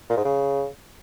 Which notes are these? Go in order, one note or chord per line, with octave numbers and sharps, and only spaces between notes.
A#2
G#2
C#3